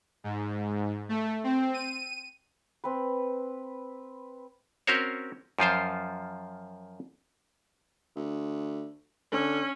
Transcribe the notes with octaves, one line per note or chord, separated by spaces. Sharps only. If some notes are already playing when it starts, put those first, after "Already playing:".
G#2
A3
C4
D#7
C4 B4
C4 C#4 F#4 A#4 C5 C#5
F#2 F3 F4 C5
D2
D3 C#4